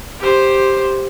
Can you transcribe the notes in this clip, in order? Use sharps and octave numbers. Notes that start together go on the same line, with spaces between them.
G4 C5